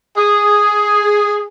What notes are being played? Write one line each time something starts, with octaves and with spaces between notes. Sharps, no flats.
G#4